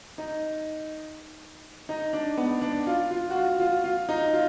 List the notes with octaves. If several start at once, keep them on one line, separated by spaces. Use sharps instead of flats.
D#4
D#4
D4
B3
D4
F4
F4
F#4
F4
F4
F4
D#4
F4